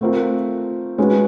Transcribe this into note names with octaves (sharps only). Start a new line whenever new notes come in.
A3 C4 F4 A#4
G#3 C#4 F#4 B4